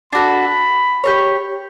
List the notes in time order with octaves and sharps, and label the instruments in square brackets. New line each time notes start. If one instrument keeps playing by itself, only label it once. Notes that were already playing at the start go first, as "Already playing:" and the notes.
[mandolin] D4 F#4 A4 [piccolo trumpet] B5
[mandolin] G4 A#4 C#5